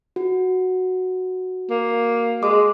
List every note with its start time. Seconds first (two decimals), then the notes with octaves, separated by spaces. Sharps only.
0.16 F#4
1.70 A#3
2.43 G#3 D6